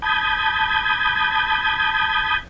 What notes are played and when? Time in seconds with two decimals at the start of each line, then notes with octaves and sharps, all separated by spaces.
0.02 A5 B5 D#6 G6 G#6